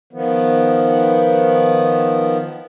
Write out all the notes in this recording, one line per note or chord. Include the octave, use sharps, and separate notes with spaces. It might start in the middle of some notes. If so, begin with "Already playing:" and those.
D#3 F3 B3